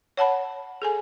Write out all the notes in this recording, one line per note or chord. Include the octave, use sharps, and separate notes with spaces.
C#5 F#5 A5 B5
G#4 A4 G#5